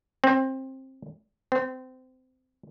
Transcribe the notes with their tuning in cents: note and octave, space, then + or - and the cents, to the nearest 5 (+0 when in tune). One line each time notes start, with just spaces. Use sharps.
C4 +20
C4 -25